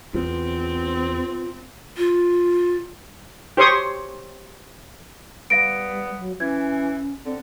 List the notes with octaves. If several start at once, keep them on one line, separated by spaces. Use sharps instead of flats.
E2 B3 C4 F4
F4
G4 C5 C#5 C6 C#6 D#6
G3 B3 F5 A#6 D7
F#3
E3 C#4 G#6
D3 C4